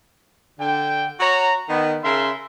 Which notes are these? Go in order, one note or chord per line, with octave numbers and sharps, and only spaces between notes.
D3 G5
F#4 C#5 A#5
D#3 B3
C#3 A#4 E5 C6